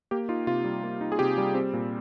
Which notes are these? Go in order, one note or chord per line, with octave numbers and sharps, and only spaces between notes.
A#3 G4
D#4 F4
C3 F4
G3
A#3
D#4
G#4
C3 G4
G3
C4
A#2